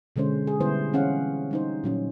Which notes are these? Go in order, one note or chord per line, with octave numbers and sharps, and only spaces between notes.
B2 D3 G#3 C#4 C5
G#4
D3 G3 B3 E4 C5
E3 C4 C#4 G#4 F5 F#5
G3 D#4 C5
A#2 F#3 C#4